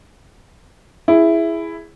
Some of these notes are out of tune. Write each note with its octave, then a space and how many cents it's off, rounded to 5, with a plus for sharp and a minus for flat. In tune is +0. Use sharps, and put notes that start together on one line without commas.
E4 +5 G#4 +0